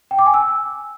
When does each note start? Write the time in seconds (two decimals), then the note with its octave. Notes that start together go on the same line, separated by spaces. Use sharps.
0.11 G5
0.19 D6
0.26 G#5
0.34 E6